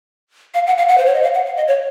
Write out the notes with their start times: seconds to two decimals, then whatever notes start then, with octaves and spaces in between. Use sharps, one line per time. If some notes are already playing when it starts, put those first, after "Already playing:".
0.54 F5
0.67 F#5
0.78 F5
0.89 F#5
0.98 C5
1.06 C#5
1.14 D#5
1.23 F5
1.34 F#5
1.46 F5
1.57 D#5
1.68 C#5